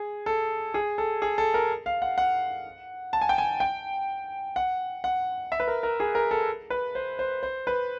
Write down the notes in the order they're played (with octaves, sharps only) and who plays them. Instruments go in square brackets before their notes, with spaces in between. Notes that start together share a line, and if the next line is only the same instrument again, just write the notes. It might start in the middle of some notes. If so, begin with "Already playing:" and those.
Already playing: [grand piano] G#4
A4
G#4
A4
G#4
A4
A#4
F5
F#5
F#5
A5
G#5
G5
G#5
G5
F#5
F#5
E5
B4
A#4
A#4
G#4
A#4
A4
B4
C5
C5
C5
B4